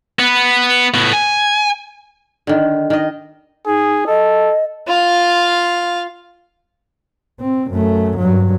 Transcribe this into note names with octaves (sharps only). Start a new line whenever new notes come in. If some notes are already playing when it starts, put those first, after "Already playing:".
B3
A2 B3
G#5
D3 D#3
D#3 D#5
D#4 G#4
A4 D#5
F4 F5
C4
F#2 A3
G2 F#3